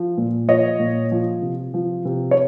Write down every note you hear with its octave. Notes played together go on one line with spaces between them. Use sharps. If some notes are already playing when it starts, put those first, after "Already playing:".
Already playing: F3
A#2
F3 C#5 D#5
A#2
F3
C3
F3
C3
C#5